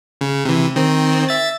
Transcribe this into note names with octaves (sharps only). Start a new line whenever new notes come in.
C#3
C3 E3
D#3 C4
E5 A6